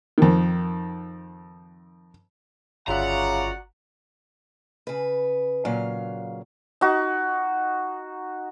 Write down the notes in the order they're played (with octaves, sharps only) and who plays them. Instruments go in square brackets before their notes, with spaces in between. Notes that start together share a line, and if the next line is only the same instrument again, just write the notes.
[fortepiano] F2 D#3
[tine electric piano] G1 F4 E5 [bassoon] C#3 [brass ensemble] F#4 D5 F#5 [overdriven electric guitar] A#5
[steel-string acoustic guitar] C#3 B4
A#2 C#3 F#3 F5
[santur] D#4 F#4